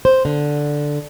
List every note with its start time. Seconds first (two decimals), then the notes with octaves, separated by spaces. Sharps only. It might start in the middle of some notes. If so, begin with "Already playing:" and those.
0.05 C5
0.25 D3